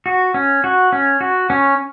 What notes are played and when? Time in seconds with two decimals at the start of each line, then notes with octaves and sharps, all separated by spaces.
0.06 F#4
0.34 C#4
0.64 F#4
0.93 C#4
1.21 F#4
1.50 C#4